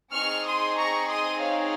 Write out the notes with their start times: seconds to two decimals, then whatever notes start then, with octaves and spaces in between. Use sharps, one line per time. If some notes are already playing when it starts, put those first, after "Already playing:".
0.13 C4 D#4 G#4 C#6 F6
0.45 C6 D#6
0.77 A#5 C#6
1.10 C6 D#6
1.41 C#5 F5